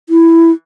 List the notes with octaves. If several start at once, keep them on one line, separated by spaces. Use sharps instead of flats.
E4